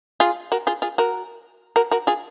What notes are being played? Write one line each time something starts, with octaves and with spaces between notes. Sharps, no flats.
F4 G#4
F#4 A#4
F4 G#4
F4 G#4
F#4 A#4
F#4 A#4
F#4 A#4
F4 G#4